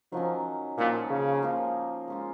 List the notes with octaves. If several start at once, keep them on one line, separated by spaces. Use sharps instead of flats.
D#3 F3 F#3 C#4
A#2 F3 A#3 D#4 A#4
C#3
F3 A#3 D#4 A#4
G#3 C#4 F4